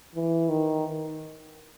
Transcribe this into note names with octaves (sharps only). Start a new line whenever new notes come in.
E3
D#3